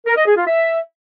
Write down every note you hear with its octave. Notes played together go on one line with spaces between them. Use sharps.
A#4
D#5
G#4
F4
E5